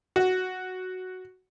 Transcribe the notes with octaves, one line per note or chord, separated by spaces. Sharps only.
F#4